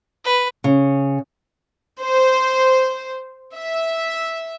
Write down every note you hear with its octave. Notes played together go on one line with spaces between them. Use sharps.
B4
C#3
C5
E5